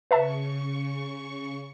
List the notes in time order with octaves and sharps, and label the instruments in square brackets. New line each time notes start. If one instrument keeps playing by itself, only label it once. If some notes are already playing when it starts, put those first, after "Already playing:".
[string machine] C#3 C#6 [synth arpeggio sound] B4 E5 A5